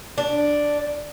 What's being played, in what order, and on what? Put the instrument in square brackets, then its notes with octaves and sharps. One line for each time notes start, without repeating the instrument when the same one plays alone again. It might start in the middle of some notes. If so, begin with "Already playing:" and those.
[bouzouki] D4